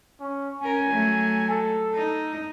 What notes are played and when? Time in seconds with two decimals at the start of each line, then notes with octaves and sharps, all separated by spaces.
0.20 C#4
0.62 C#4 A#4 G#5
0.90 F#3 A3
1.50 A4
1.94 D#4